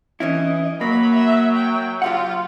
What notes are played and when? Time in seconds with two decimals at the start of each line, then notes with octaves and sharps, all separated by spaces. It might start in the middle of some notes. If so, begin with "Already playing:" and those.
0.20 E3 C#4 E4 D#5
0.81 F#3 A#3 B5
1.14 E5
1.56 G5
2.02 F4 G4 F5 F#5